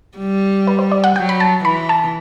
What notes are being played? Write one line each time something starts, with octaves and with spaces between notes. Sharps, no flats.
G3
B4
C5
D5
F#5
F#3 G5
B5
A5
E3 B5
A5